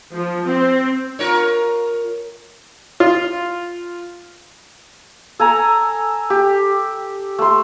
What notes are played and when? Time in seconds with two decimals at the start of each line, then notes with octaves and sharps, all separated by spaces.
0.13 F3
0.45 C4
1.19 F4 A#4 C#5
3.00 F4
5.39 A4 G#5 A#5
6.30 G4
7.39 A3 C6